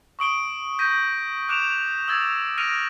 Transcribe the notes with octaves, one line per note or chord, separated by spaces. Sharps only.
C#6 D#6 D7 G7
G6 A#6 B6 D#7
D6 F#6 D7 E7 F7
D#6 E6 G#6 A6
F6 A#6 D7 D#7 F7